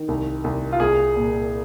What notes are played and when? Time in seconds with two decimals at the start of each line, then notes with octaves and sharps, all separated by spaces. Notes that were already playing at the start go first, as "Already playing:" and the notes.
Already playing: D#3
0.08 C2
0.44 C2
0.72 F4
0.80 C2 G#4
1.15 A#2